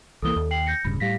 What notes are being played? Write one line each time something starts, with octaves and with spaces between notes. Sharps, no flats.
C2 E3 A#3 A4 D#6 G7
D#2 A4
G5 C7 F#7
G6 A#6 C#7
D1 G2 C#3 B5
A2 G3 F5 A#6 B6